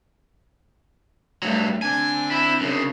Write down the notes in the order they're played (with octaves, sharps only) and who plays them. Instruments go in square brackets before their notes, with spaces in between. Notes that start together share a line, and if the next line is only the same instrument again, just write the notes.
[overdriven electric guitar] G2 F#3 [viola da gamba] A3
[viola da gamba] D3 C4 D4 [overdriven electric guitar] G#5
[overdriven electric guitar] E4
F#2 C#3